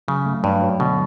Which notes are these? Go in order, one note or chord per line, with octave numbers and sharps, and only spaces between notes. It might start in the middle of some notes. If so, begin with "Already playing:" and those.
C#3 F#3
A3
G2 F#3
F#3
B2 D3